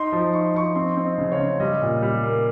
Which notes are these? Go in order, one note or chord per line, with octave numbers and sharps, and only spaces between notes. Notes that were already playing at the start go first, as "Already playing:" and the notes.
Already playing: D#4 C6
F3
D#4 C#6
C6
F3 C#6
C4 C6
C4
D#5
C#3
C#5
C#3
G3 D#5
A#2
G3
A#3